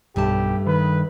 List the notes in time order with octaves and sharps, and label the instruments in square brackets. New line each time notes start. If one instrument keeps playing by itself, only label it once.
[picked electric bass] B1 [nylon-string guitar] G2 A3 A5 [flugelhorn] G4
[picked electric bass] D#3 [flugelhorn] B4